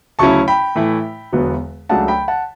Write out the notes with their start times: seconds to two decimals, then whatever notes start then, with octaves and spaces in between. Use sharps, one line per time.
0.19 D2 C#3 F#3 C#4 E4 A5 C#6
0.48 G5 B5
0.75 A2 E3 A3 E4
1.33 E1 E2 D3 F#3 B3
1.89 C#2 C#3 F#3 A3 D4 F#5 A5
2.08 G5 B5
2.28 F#5 A5